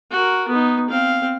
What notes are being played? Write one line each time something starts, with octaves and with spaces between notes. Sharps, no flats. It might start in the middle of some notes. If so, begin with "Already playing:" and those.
F#4 A#4
B3 D#4
C4 F5